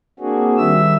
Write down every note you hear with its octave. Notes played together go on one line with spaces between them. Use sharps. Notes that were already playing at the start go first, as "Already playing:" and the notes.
A#3 C4 D4 F#4 G#4
D#3 G3 E5 E6